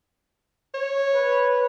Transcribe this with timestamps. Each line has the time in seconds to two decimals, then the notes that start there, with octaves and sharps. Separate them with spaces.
0.74 C#5
1.14 B4